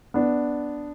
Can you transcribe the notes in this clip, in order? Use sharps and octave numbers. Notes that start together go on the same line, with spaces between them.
B3 D4